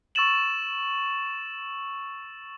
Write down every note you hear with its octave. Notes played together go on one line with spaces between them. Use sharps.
C#6 E6 A6 D#7 E7 F#7